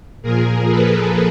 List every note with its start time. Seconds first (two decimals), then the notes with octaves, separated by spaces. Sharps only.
0.22 A#2 F3 G#4 A#4
0.68 A4 B4